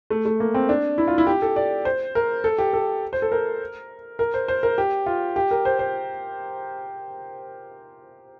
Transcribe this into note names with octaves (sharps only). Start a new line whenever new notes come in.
A3
A3
A#3
C4
D4
E4
F4
E4
G4
A4
D5
C5
A#4
A4
G4
A4
C5
A4
A#4
A#4
C5
C5
A#4
G4
F4
G4
A#4
C5
C5